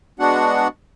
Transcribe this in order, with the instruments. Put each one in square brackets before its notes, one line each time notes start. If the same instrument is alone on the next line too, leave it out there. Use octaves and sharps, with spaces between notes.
[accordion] G#3 B3 D4 F#4 F#5